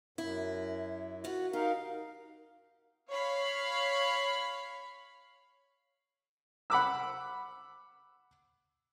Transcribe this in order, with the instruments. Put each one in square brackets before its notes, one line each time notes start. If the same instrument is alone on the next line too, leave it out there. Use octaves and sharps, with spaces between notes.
[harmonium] F#2 [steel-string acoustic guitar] E4
[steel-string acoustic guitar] F4 F#4
[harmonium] D#4 A#4 F5 [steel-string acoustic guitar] G4
[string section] C#5 F5 B5
[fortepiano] F#5 B5 D6 E6